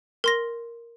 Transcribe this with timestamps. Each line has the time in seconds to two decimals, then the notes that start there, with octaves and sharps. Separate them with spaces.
0.24 A#4 C6 A#6